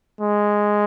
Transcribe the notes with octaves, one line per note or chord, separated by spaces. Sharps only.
G#3